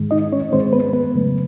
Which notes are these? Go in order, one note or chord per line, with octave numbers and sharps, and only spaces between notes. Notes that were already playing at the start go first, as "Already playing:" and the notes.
Already playing: G#2 D#3 G#3
D#4 D#5
C#4 C#5
G#2 D#3 G#3 C4 C5
B3 B4
B3 B4
F2 C#3 F#3 A3